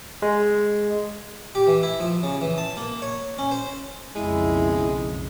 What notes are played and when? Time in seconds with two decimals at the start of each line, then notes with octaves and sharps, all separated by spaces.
0.22 G#3
1.55 G4
1.67 E3
1.83 E4
2.00 F3
2.23 C#3
2.41 E3
2.58 A5
2.77 A#3
3.02 C#5
3.39 C#4
3.51 C5
4.15 B1 F2 C#3 G#3 E4